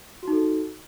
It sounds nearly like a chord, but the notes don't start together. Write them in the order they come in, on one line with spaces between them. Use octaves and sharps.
F#4 D#4 A4